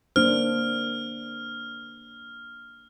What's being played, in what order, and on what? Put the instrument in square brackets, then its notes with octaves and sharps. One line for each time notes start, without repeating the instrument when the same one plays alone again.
[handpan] A#3 D4 C5 [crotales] F6